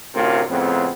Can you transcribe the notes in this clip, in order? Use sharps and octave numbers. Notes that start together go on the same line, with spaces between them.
D2 A2 C3 C#4 F4 A#4
F2 A2 C#3 B3 C4